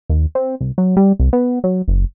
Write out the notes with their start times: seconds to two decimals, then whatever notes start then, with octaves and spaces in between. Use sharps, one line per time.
0.10 D#2
0.35 C4
0.61 C2
0.78 F#3
0.97 G3
1.19 C2
1.33 B3
1.64 F#3
1.88 F#1